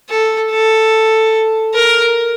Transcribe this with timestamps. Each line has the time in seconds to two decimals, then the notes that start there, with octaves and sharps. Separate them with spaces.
0.10 A4
0.51 A4
1.75 A#4